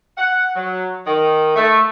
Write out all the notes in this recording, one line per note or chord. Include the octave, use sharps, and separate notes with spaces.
F#5
F#3
D#3
A3